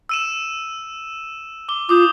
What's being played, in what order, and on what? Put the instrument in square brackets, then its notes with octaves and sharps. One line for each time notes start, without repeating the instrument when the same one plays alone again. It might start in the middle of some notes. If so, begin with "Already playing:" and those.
[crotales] E6 D#7 E7
D6 G7
[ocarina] F4 [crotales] D6 D#6 G6